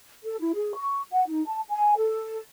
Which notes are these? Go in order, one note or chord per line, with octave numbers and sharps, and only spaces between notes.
A4
E4
G#4
C#6
F#5
D#4
A5
G#5
A4